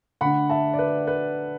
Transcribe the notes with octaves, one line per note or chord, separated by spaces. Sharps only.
D3 A3 D4 F#5 B5
E5 A5
D5
B4
B4